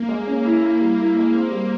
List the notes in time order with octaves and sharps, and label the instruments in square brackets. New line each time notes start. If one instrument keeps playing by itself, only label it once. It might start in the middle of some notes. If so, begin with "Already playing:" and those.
Already playing: [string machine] A#3
[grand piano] G#3
C#4
E4
E4
G3
E4
G#3
C4
G3